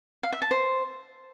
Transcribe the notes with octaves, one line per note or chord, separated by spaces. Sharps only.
F5
E5
A5
C5